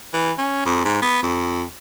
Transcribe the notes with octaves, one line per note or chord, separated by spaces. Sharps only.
E3
C#4
F2
G#2
B3
F2